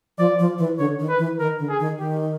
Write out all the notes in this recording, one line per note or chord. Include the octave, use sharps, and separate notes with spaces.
F3 D5
F3
E3
D3 C#5
D#3
B4
E3
D#3 A#4
D3
G#4
D#3
D#3 G4